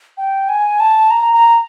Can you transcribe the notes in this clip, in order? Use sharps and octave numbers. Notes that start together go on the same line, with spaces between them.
G5
G#5
A5
A#5
A#5